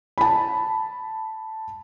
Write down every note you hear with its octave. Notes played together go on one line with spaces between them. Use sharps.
A5 B5